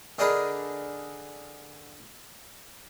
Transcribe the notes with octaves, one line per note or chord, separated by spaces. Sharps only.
D3 D4 D#4 G#4 A#4 B4